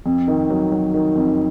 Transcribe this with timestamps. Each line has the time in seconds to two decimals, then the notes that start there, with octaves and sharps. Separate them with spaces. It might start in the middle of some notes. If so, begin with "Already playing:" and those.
0.06 F2
0.28 D#3
0.50 F#3
0.72 F#3
0.94 D#3
1.16 F2